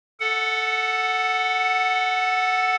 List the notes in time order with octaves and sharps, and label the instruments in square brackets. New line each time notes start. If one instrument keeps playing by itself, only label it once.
[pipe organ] A4 F#5